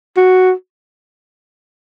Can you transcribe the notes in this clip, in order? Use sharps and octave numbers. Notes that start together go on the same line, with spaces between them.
F#4